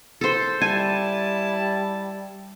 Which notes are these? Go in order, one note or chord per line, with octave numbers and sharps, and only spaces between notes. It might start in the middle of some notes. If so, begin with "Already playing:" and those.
A4 C5
G3 E4 G#5 A5